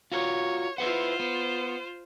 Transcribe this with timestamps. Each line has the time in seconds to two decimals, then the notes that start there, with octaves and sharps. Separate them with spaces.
0.12 F4 F#4 A#4 C#5
0.78 E4 F4 B4 C5 F#5
1.19 B3